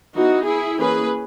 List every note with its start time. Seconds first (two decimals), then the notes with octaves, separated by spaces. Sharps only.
0.15 E3 B3 D#4 F#4
0.46 E4 G#4
0.78 E3 A#3 C#4 G#4 B4